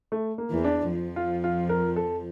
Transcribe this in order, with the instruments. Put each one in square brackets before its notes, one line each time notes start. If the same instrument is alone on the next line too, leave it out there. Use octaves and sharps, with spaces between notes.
[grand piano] A3
A#3
[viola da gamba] E2 E3
[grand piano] D4
[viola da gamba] F2 F3
[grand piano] F4
F4
A#4
A4